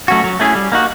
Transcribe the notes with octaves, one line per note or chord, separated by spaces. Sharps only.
F#3 A3 C#4 F#4
F#3
A3 C#4 E4 G#4
G3
A#3 D#4 F#4